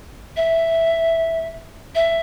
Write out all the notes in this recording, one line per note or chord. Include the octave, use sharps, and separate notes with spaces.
E5
E5